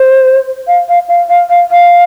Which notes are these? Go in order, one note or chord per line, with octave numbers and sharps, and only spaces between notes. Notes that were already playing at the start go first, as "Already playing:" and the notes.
Already playing: C5
F5
F5
F5
F5
F5
F5